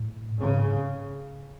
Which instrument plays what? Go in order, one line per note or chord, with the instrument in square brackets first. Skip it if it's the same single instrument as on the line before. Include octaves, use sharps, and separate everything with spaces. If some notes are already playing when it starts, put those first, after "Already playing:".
Already playing: [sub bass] A2
[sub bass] G#2 [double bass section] C#3